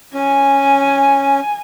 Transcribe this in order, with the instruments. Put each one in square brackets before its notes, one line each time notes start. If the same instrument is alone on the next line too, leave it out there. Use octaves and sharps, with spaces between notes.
[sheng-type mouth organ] C#4 [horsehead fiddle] G#5